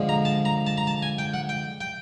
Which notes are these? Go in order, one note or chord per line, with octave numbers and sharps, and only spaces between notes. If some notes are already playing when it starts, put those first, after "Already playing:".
Already playing: D3 F3 G#3
A#5
A5
A#5
A5
A#5
A5
G#5
G5
F#5
G5
G5